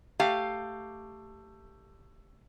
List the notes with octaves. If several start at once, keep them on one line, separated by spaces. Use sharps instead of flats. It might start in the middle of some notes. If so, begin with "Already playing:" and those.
A3 G4 F5